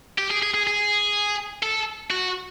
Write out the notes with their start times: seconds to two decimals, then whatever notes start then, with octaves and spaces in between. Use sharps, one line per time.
0.18 G4
0.31 G#4
0.43 G#4
0.54 G#4
0.67 G#4
1.63 A4
2.11 F#4